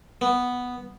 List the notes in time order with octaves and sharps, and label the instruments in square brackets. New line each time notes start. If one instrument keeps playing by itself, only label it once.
[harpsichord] B3